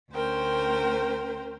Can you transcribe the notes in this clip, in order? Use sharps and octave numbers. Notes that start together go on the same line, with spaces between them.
D2 C#4 A#4 C5 G5